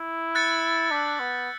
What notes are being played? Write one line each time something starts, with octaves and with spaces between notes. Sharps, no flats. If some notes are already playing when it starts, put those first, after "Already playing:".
Already playing: E4
F#6 A6 C#7
D4 E6 G6 B6
B3